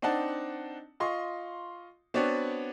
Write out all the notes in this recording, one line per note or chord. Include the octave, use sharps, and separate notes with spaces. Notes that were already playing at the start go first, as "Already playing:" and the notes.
C4 D4 D#4 D5 F#5 A5
F4 D#5 C6 C#6
B3 C4 D4 F#4 C#5 D5